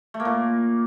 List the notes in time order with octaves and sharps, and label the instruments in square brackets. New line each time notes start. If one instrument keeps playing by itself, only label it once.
[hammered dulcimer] A3
A#3
A#2